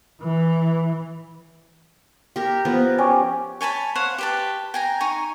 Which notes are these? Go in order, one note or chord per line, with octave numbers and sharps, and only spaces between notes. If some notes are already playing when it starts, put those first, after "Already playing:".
E3
G4 A#4
F3 B3 A#4
C#4 G4
C#5 G#5 A5 B5
C5 C#5 F5 F#5
G4 B4 A5
G5 G#5 A#5
D#4 G#5 A#5 C#6